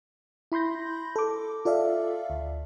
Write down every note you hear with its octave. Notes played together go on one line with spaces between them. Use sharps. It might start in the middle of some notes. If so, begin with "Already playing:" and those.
E4 B5 C6 G6 A#6
A4 D6
F4 A4 D5 E5 F5
D2